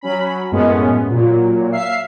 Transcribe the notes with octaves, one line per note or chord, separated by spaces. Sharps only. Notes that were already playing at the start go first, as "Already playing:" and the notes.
F#3 C#4 B5
F#2 A2 G#3 B3 C#4
A#2 F#3
E5 F5 C7